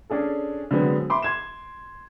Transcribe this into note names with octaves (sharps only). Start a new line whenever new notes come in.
C#4 D4 G#4 A4
D3 F#3 G#3 B3 C4
E5 B5 C6 D6
C6 G#6 E7